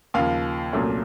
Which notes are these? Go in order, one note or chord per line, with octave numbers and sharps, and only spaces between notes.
D#2 C#3 F3 F5
C2 A#2 F#3 A3 C#4